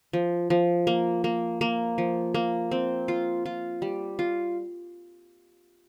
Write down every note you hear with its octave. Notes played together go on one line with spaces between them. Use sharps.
F3
F3
A#3
A#3
A#3
F3
A#3
C4
F4
F4
G3
F4